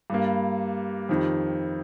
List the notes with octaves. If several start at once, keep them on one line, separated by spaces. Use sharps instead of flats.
G2 G3 A#3
F2 D#3 G3